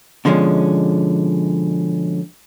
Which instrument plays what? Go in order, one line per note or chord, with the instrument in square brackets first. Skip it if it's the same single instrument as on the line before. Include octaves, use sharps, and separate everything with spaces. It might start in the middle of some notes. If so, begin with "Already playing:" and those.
[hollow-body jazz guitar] B2 D3 F3 G#3 C#4